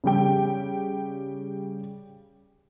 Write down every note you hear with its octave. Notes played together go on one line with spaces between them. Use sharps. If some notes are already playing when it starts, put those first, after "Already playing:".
C#3 G3 G4 G5